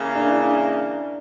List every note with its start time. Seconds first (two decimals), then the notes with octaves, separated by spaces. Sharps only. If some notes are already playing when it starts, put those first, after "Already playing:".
Already playing: C#3 E3 A#3
0.15 D4
0.27 E4
0.39 D4